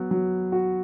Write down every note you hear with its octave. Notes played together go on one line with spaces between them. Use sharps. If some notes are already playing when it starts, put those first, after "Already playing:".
Already playing: F#3 B3
F#3
F#4